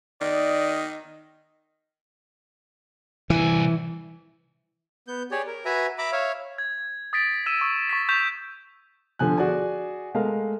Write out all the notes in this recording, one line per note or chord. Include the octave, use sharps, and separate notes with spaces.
D#3 D5 D#5
C2 E3 G#5
B3 G6
G4 G#4 C#5 D5
A#4
F#4 B4 E5 G#5 A#5
E5 A#5 B5 D6
C#5 E5 F5
G#6
D#6 A6 B6 D7
E6 B6 D#7 E7
C#6 D#6
C#6 A6 B6
C#6 G6 B6 E7 F7
D3 F3 G#5 F#6
F#4 G#4 D5 G#5
G#3 A3 A#4 F5